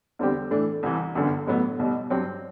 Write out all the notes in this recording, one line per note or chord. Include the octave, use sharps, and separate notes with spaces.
E2 D3 G3 C4 G4
A2 E3 A3 D4
C2 C3 E3
G1 F#2 D3
A1 A2 F#3 B3
B1 B2 G3
G2 F#3 C4 G4